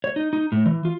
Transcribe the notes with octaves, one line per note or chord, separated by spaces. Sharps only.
C#5
D#4
D#4
A2
E3
F4